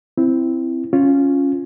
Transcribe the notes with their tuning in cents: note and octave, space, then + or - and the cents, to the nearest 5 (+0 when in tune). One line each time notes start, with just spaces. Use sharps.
C4 +0 E4 +10
C#4 +0 F4 +0